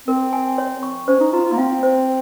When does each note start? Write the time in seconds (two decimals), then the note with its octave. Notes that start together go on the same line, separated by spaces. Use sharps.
0.08 C4 A#4
0.33 G#5
0.58 C#5
0.83 C#6
1.08 C#4 C5
1.20 D#4
1.33 F4 A#5
1.45 F4
1.52 A#3
1.58 C4 F5
1.83 C5